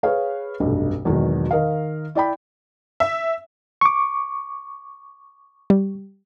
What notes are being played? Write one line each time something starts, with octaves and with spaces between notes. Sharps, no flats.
G#4 B4 C#5 F5
F1 B1 G2
G#1 E2 B2 D#3 F#3
D#3 A#4 D#5 F5
E4 D5 G5 B5
E5
C#6 D6
G3